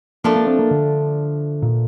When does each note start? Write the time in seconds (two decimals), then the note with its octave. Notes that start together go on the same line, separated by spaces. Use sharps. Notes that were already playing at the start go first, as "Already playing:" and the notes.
0.24 F3 A3 A#3 D4 F4
0.36 A#3
0.47 C4
0.59 A#3
0.71 D3
1.62 A#2